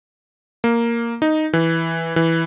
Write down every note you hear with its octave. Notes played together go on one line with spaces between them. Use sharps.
A#3
D#4
E3
E3